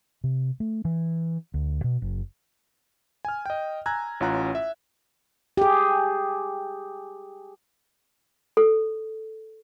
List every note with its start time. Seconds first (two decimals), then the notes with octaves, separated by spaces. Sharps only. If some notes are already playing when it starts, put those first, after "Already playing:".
0.24 C3
0.60 A3
0.85 E3
1.54 D2
1.84 B2
2.02 F#1
3.25 G#5 F6
3.46 D#5 G5
3.86 G#5 A#5 E6 F#6 G#6
4.20 A1 C#4 F4 F#5 A#5 F#6
4.55 E5
5.57 G4 G#4
8.57 A4